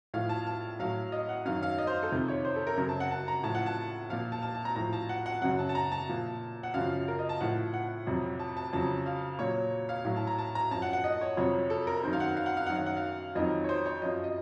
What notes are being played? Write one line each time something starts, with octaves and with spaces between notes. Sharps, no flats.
A2 F3 F5
A5
A5
A2 F#3 F5
D#5
F#5
F#2 D#3 F#3 F5
F5
D#5
C5
A4
F2 C3 D#3
C#5
C5
A4
A#4
F#2 C#3 F#3 A#4
A5
F#5
A5
A#5
A2 F3 A5
F#5
A5
A#2 F3 F5
A5
A5
A5
A#5
A2 F3 A#5
A5
F#5
F#5
F#2 C#3 F#3 F#5
A5
A5
A#5
A5
A#2 F3
F#5
F#2 C#3 F3 F5
A#4
D#5
A5
A2 F3 F#5
F#5
F2 C3 F#3
A5
A5
F2 C#3 F#3 A5
F5
A#2 F#3 C#5
F5
A2 F#3 F5
A5
A#5
A5
A#5
F#2 F3 A5
F#5
F#5
D#5
C#5
F2 C3 F#3 C#5
A4
A#4
F#2 D#3 F#3 C5
F5
F#5
F5
F#5
F5
F#2 D#3 F#3 F#5
F5
F#5
F5
F2 D#3 F#3 D#5
C#5
C5
C#5
F#2 F3 D#5
D#5